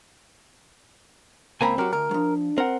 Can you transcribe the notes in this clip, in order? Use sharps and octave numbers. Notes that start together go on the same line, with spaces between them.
C#2 A#3 C4 G#5 A#5 B5
F#3 C4 F#4 G4 A#4
D2 A#4
F3 F#3 D4
C4 A#4 F#5